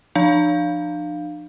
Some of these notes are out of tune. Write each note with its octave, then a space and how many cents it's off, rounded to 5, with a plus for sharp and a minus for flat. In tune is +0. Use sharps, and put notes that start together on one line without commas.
F3 +0 D4 +45 F5 +0